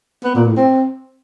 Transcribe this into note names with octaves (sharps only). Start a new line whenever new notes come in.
B3
A#2
A2
C4